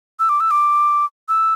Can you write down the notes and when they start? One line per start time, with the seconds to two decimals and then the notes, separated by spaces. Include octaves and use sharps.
0.20 E6
0.29 D6
0.40 E6
0.51 D6
1.29 E6